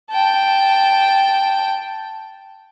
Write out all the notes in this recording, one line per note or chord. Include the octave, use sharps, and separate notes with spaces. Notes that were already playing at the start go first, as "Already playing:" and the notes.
G5 A5